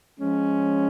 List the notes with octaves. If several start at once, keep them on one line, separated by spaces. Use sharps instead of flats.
F3 G#3 C#4